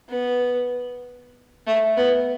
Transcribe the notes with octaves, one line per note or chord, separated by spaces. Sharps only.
B3
A3
B3